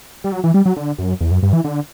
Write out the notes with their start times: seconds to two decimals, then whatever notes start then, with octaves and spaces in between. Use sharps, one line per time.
0.24 G3
0.32 F#3
0.44 E3
0.54 G3
0.66 F#3
0.76 D3
0.98 F#2
1.21 E2
1.31 F#2
1.43 G2
1.53 E3
1.64 D3